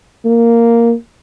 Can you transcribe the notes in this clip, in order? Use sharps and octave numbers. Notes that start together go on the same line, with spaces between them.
A#3